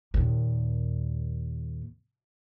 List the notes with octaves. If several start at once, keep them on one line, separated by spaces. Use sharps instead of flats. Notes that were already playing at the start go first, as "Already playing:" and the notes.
D#2 A#2